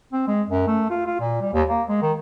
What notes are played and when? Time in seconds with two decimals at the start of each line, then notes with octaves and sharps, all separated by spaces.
0.13 C4
0.28 G#3
0.50 F#2
0.67 A3
0.90 F4
1.07 F4
1.20 A#2
1.41 G3
1.53 D#2
1.68 A#3
1.89 G#3
2.02 D#3